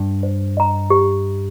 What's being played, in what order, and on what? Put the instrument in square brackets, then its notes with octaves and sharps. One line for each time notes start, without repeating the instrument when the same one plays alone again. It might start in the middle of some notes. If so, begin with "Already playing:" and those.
Already playing: [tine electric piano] G2
[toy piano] C5
D#5 A#5
G4